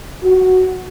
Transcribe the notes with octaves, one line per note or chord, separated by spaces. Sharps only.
F#4